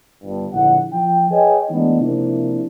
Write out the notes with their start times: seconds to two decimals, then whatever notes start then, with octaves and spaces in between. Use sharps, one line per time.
0.24 G1 G2
0.54 A#1 D3 E4 F#5
0.93 F3 G5
1.31 G#4 B4 C#5 D#5 G5 G#5
1.71 E3 G#3 A3 B3 D4 D#4
2.00 C3 F3 A#3 D4 E4